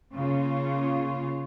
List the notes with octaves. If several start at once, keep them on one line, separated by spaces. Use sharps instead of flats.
C#3 A#3 F4